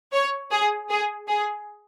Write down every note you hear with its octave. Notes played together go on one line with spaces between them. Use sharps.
C#5
G#4
G#4
G#4